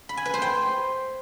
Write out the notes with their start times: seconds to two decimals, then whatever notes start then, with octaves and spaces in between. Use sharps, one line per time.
0.09 B5
0.17 G#5
0.25 B4
0.34 C5
0.42 G5